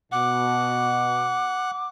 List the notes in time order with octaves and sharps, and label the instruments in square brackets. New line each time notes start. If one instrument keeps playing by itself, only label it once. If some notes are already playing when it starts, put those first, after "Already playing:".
[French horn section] B2 [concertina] F#5 [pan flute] D6